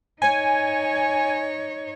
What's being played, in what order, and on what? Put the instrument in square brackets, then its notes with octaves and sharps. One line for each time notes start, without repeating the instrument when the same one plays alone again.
[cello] D#4 C#5 [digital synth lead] G#5